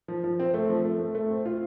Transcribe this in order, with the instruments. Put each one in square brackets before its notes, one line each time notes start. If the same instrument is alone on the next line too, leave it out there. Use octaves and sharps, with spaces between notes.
[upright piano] F3
F3
C4
A3
F3
A3
A3
A3
C4
F4